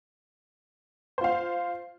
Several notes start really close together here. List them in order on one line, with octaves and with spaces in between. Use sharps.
C5 F4 F5